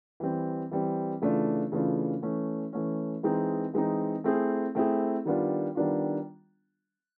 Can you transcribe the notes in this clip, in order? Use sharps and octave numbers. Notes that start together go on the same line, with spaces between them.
E3 G3 C4
E3 G3 C4
C#3 E3 A3 D4 F4
C#3 E3 A3 D4 F4
E3 A3 C#4
E3 A3 C#4
E3 G#3 C4 D#4
E3 G#3 C4 D#4
A3 C4 E4 G#4
A3 C4 E4 G#4
D#3 G3 B3 D4 F4
D#3 G3 B3 D4 F4